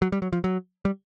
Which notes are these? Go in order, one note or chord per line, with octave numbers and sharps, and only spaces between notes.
F#3
G3
F#3
F3
F#3
G3